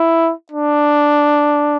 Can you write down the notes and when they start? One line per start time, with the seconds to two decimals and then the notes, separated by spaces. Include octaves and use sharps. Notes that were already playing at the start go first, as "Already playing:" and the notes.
Already playing: E4
0.52 D4